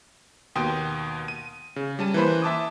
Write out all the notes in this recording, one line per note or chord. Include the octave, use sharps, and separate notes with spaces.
D#2 B2 G5 C6 D#6
D#7
C#3
G3 C#4 A5 D#7
E3 A#3 B4 C5 B5
E5 A5 D6 D#6